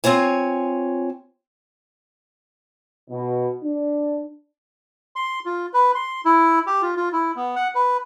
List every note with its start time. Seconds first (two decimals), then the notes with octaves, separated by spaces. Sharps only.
0.04 C4 F4 C#5 G#5
3.10 B2
3.64 D4
5.16 C6
5.45 F4
5.73 B4
5.95 C6
6.25 E4
6.67 G4
6.82 F4
6.97 F4
7.13 E4
7.36 B3
7.56 F#5
7.75 B4